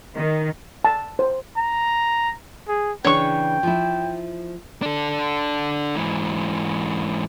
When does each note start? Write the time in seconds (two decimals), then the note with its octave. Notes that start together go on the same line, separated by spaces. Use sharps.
0.15 D#3
0.85 A5
1.19 C5
1.58 A#5
2.69 G#4
3.04 C#3 E3 D4 C#5 G5 C#6
3.63 F3 E4
4.82 D4 A4
5.96 G#2 E3